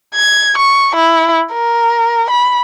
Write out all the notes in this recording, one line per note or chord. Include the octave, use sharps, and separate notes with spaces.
G#6
C#6
E4
A#4
B5